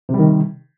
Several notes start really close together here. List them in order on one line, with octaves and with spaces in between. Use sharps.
C3 G3 D#3